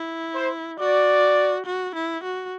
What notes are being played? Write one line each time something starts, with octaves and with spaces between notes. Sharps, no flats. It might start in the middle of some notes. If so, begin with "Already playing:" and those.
Already playing: E4
C5
F#4 D5
F#4
E4
F#4